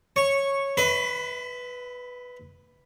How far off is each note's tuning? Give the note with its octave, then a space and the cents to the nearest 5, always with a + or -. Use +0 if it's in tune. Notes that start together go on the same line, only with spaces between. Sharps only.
C#5 -10 C#6 -5
B4 +0 E5 -45 B5 +40